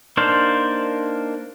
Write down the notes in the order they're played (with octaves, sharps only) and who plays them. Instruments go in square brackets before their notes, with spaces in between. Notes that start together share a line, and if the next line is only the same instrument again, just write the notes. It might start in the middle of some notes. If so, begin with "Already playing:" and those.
[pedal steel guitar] A#3 D4 D#4 C5 F5